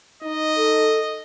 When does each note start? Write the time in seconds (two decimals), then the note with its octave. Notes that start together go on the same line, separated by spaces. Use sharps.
0.23 D#4 D#5
0.57 A4